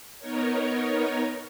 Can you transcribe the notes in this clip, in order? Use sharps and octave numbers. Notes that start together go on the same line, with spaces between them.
B3 D#4 A#4 C#5